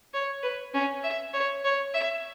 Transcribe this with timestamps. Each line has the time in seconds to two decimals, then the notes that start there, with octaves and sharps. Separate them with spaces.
0.13 C#5
0.43 B4
0.74 C#4
1.04 E5
1.34 C#5
1.64 C#5
1.94 E5